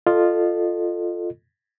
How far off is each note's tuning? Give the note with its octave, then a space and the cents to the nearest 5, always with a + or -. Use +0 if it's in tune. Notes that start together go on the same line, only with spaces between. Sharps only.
F4 +0 A4 +0 D#5 -30